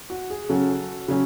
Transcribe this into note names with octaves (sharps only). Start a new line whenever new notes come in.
F#4
G#4
C#3 F#3 C#4 F#4 A4
C#3 F#3 C#4